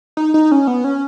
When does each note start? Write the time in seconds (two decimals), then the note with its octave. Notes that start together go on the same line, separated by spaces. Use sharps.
0.17 D#4
0.34 D#4
0.52 C#4
0.67 B3
0.84 C#4